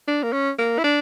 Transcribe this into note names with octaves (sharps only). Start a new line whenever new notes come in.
D4
A#3
C#4
A#3
E4
D4